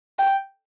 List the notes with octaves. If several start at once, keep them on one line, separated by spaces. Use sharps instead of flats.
G5